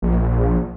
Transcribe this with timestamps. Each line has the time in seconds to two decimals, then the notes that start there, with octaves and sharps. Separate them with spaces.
0.02 A#1